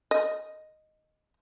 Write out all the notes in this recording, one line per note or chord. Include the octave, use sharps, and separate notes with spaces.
D#5